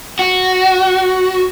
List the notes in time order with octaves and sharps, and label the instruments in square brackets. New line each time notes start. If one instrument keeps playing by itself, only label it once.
[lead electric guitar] F#4